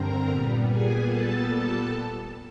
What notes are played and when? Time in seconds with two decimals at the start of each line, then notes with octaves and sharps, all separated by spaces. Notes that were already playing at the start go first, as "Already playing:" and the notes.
Already playing: G2 D3 C4 A#4 A#5
0.28 A#2 G3 B3
0.67 G#4 G#5
1.06 A4 A5